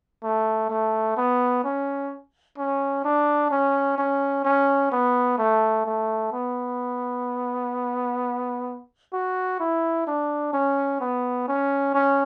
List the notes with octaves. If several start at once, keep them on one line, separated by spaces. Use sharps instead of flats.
A3
A3
B3
C#4
C#4
D4
C#4
C#4
C#4
B3
A3
A3
B3
F#4
E4
D4
C#4
B3
C#4
C#4